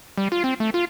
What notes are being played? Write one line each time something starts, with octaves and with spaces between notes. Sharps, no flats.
G3
F4
C4
A3
F4